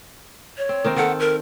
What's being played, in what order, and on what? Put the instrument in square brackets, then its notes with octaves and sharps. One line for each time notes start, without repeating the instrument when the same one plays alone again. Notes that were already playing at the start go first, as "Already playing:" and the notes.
[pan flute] C#5
[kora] C4
D#3 A#3 C4
[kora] D#3 A4 [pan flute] F#5
[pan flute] A#4